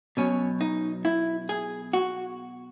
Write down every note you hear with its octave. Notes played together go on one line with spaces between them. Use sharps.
B2 F#3 C#4
D#4
E4
G#4
F#4